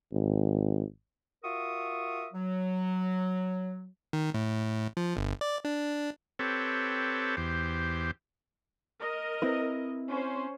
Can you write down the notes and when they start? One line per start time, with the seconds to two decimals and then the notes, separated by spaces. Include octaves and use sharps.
0.12 G#1
1.44 F4 F#4 A#4 E5 C#6 D#6
2.33 F#3
4.13 D#3
4.34 A2
4.97 F3
5.17 G1
5.41 D5
5.65 D4
6.39 C4 G4 A4 B4 C#5
7.37 E2 G4 C5
9.00 A#4 D#5
9.42 C4 E4 B4
10.09 C#4 C5